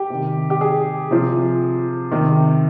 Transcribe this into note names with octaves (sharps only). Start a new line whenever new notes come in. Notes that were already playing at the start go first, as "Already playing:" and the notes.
Already playing: G4
C3 D#3
G4
G#4
C3 F3
C3 D#3